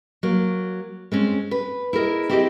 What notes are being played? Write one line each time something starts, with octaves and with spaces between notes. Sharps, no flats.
F#3 A#3
G#3 C4 C#4
B4
E4 G#4 A#4 D#5
C4 E4 G4 G#4 D5 D#5